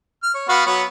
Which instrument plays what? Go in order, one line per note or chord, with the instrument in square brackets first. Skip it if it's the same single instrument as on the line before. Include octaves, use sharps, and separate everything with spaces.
[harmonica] F6
C#5
B3 F#4 F5
F#3 B3 C#5